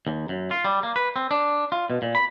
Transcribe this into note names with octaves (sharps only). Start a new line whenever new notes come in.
D#2
F#2
F4
G3
A#3
B4
C4
D4
F4
B2
A#2
B5